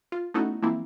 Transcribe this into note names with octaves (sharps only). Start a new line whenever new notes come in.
F4
A3 B3 C#4 D#4 E4 F#4
E3 F3 G#3 A#3 C4 E4